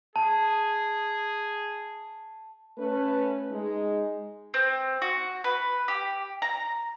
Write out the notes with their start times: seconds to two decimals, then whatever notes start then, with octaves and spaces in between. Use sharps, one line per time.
0.16 G#4 A5
2.79 A3 C#4 B4
3.52 G#3 D#4
4.54 C4
5.02 F#4
5.44 B4
5.88 G4
6.42 A#5